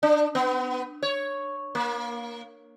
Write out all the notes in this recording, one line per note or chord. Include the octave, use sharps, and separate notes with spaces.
D4
B3
C#5
A#3